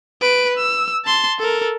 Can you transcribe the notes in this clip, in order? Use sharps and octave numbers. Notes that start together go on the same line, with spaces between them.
B4 D7
E6
A5 C6
A4 A#4